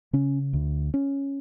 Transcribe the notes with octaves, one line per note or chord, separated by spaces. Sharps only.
C#3 C#4
D2
C#4